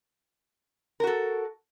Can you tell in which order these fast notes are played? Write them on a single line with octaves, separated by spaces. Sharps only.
A#4 F#4 A4